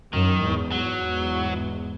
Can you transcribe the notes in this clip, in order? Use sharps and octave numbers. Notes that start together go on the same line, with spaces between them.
F#2 D#3
E2 G#2
F#3
E2 G#2